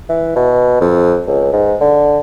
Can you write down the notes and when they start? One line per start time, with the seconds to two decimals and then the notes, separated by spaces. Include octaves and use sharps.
0.09 E3
0.36 B2
0.81 F2
1.27 C#2
1.53 G#2
1.81 D3